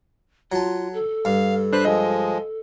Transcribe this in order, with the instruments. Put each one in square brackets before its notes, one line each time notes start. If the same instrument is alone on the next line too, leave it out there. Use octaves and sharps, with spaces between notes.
[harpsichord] F#3 A5 [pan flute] F4
[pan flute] A4
[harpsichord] G2 [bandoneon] F5
[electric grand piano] D4 C5 [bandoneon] B4 F#6
[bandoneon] F3 G#3 [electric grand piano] D#5